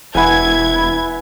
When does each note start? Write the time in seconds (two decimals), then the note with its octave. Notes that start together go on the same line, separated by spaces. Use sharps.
0.15 E1 E4 B4 F#5 G#5 G#6